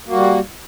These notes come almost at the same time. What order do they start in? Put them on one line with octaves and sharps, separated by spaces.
A#3 F#4 G3